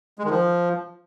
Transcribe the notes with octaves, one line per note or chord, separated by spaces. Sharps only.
G#3
D#3
F3